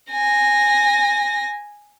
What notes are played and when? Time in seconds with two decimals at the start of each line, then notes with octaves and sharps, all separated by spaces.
0.11 G#5 A#6